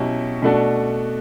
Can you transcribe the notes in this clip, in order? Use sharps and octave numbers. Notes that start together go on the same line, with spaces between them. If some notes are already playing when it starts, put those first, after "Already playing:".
Already playing: B2 F#3 C#4 E4 G4
B2 A3 D4 F#4